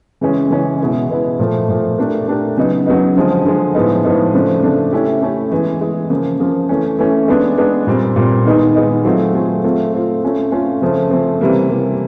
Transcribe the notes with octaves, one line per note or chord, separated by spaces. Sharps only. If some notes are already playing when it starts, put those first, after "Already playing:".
C#3 E3 G#3 C#4
C#3 E3 G#3 C#4
B2 G#3 B3 E4
B2 G#3 B3 E4
A#2 F3 A3
A#2 F3 A3
A3 D4 G4 A#4
A3 D4 G4 A#4
C#3 F#3 B3 D#4
C#3 F#3 B3 D#4
D3 F3 G#3
D3 F3 G#3
A2 F3 G#3 B3 D#4
A2 F3 G#3 B3 D#4
C#3 F3 A3 D4
C#3 F3 A3 D4
A3 C#4 E4 G4
A3 C#4 E4 G4
E3 G#3 B3
E3 G#3 B3
C#3 F3 A#3
C#3 F3 A#3
E3 A3 C#4
E3 A3 C#4
G#3 B3 D4
G#3 B3 D4
A#2 G3 C4
A#2 G3 C4
D#3 G#3 B3 D#4
D#3 G#3 B3 D#4
F#3 A3 C4 F4 G#4
F#3 A3 C4 F4 G#4
A3 C4 F4
A3 C4 F4
A3 C#4 F4
A3 C#4 F4
C#3 F3 A3 C4
C#3 F3 A3 C4
C3 E3 G3 A#3
C3 E3 G3 A#3